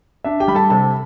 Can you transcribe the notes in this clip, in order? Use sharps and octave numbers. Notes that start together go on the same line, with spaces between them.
D4 E5
G4 G5
G3 B5
A4 A5
C3 A4 A5